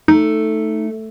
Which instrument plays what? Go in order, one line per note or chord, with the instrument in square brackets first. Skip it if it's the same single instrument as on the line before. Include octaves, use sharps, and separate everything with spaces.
[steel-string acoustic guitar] A3 [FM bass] D#4